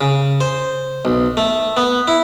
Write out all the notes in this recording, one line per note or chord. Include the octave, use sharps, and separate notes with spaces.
C#3
C5
B1
A3
B3
E4